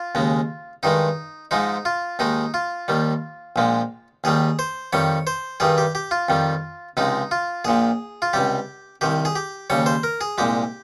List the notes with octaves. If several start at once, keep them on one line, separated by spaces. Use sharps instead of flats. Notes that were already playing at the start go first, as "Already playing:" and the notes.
Already playing: F4
D#2 C#3 G#3
G2 D#3 G#3 D#4
G#2 F3 G#3 D#4
F4
D#2 D#3 G#3 D#4
F4
D#2 D#3 G3
A#1 A#2 F3 G#3
D#2 D#3 G3 G#4
C5
F2 D#3 G3 C#5
C5
G2 D#3 G3 G#4
G4
G4
F4
F2 D#3 G3
C#2 C3 F3 G#3 D#4
F4
A#1 A#2 F3 G#4
F4
C#2 C3 G3 G4
C2 C3 D#3 G4
G#4
G4
D#2 C#3 G3 C#5
C5
A#4
G#4
C2 A#2 G#3 G4